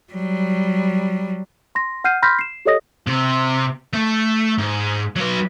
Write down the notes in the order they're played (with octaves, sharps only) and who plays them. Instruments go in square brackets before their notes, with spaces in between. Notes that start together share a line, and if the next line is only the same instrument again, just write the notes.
[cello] F#3 G3
[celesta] C6 A#6
F#5 F6 G6 C7 D#7
B5 C6 F6 G6 A#6 B6
C7 E7
G4 A4 C#5 D#5 D#6 A#6
[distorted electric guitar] C3
A3
G#2
F#3 B4